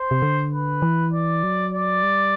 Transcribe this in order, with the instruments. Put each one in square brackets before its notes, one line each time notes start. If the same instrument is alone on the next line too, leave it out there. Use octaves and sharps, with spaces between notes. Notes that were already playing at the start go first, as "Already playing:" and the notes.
Already playing: [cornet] C5
[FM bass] C3
D3
[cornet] B4
[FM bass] E3
[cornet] D5
[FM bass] F#3
[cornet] D5
[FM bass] G3